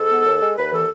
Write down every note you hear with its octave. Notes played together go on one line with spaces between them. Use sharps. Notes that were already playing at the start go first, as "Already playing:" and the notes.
Already playing: G#2 A4
B3
D#2
G#3
D#2 B4
E3 A4